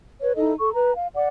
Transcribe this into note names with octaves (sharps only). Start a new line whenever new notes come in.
B4 C#5
D#4 E4 A4 D#5
A4 C#6
B4 A#5
F5
D5 F#5 D6